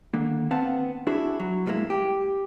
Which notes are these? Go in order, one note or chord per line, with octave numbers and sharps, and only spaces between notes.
D3 D#3 A#3
B3 C4 F5 F#5 A5
D4 E4 F#4 G#4 E5
F#3
C2 A2 G3 G#3 A#3 E4
G4